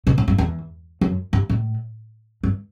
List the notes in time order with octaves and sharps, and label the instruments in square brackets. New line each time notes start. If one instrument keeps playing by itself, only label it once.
[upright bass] B2
A2
G2
E2
F#2
G2
A2
G2